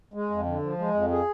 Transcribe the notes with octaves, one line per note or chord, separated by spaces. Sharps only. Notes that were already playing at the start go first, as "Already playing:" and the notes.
G#3
F2
D3
F3
G#3
F2
G#4